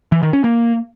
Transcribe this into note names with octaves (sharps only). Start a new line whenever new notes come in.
E3
D#3
C#4
A#3